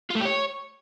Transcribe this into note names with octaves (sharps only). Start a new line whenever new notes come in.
F4
A3
G4
C#5